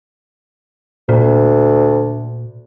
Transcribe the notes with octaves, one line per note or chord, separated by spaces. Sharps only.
D2 A#2